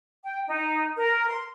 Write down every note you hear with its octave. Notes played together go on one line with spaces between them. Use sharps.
G5
D#4
A#4
C6